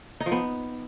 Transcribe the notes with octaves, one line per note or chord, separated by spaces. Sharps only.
D#4
F3
B3